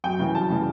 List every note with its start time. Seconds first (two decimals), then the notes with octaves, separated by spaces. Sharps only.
0.04 F#2 G5
0.19 C#3 E3 G3
0.35 F#2 A5
0.50 C#3 E3 G3